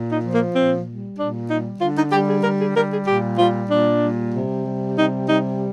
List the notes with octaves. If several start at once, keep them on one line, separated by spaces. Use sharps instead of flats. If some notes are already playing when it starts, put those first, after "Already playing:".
Already playing: A#2
D#4
F3
A#3
A#2 C4
G3
A#2 D4
G3 D#4
D3 F4
D#4
G3 G4
G#4
D3 A#4
G#4
G3 A#4
G#4
A#2 G4
G3 F4
A#2 D4
G3
C3
G3
C3 D#4
G3 D#4